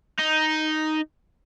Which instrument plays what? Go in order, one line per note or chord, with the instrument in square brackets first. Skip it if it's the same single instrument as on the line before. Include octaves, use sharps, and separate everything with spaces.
[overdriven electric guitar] D#4